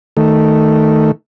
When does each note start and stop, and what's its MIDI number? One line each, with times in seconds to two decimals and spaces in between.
0.17 1.11 51
0.17 1.11 57